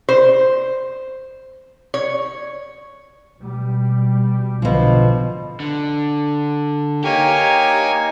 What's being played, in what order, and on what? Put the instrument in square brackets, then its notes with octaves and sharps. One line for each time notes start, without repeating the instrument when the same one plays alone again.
[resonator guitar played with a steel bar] C5
C#5
[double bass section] B2 G3
[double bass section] B1 D3 [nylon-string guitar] B2 F3
[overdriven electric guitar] D3
[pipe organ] A#3 C#5 G#5 [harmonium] D#4 [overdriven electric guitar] G4